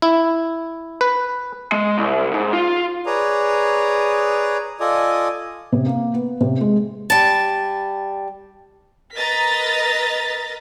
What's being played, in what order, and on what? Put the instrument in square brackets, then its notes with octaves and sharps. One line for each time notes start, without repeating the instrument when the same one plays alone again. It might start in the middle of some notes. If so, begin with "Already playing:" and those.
[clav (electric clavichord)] E4
B4
[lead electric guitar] G#3
C2
G#2
F4
[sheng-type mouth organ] G#4 B4 C#5 D5 A#5 D#6
F4 A4 D5 D#5 G#5 D#6
[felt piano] C3
A#3
B3
C3
G#3
[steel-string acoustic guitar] G3 A5
[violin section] A#4 B4 D#5 A#5 A6 B6